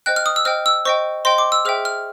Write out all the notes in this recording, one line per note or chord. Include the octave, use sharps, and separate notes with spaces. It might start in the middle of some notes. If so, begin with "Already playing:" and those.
C5 D#5 G5 F#6
F6
D#6
E6
C5 D#5 G5 F6
E6
C5 D#5 G5 C#6
C5 D#5 G5 C6
D6
E6
G#4 C5 E5 G5 F6
F6